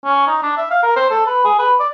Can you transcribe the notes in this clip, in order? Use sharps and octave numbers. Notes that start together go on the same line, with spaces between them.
C#4
D#4
D4
E5
F5
A#4
C5
A4
B4
G#4
B4
D5